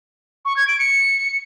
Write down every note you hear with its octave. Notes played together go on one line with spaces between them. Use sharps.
C#6
G#6
D7
C#7